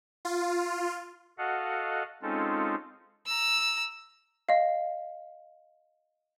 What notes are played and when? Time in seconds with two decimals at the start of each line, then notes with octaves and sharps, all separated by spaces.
0.25 F4
1.38 F#4 A4 D#5 F5 F#5
2.22 G#3 C4 C#4 D#4 F4 A4
3.26 A#5 E6
4.49 D#5 F5